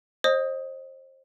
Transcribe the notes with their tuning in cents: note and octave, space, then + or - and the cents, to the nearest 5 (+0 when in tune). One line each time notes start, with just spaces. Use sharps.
C5 +30 D#5 -15 D#6 +10